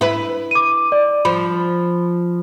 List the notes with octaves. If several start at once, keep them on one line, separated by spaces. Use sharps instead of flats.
E4 B4
D6 D#7
D5
F3 B5